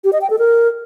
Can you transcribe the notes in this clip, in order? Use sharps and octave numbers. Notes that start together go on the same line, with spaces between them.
G4
D#5
G5
A4
A#4